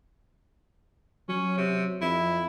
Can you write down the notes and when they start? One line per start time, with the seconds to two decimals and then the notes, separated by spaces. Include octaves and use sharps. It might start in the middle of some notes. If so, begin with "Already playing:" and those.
1.29 F#3 C#4
1.57 C3
2.02 F2 E4